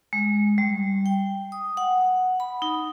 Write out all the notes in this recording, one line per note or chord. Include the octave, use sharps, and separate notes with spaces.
G#3
G3
G5
D#6
F#5
B5
D#4